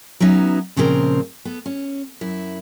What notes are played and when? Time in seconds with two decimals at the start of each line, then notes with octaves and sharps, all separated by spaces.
0.20 F#3 B3 C#4 D#4 E5
0.76 A#2 C#3 F3 C4 G#4 A#4
1.45 B3 A4
1.66 C#4
2.21 F#2 E4